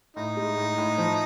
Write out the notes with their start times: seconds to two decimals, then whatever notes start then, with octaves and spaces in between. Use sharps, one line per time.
0.16 A2 D#4
0.37 G#3
0.57 A2
0.78 A2
0.98 F3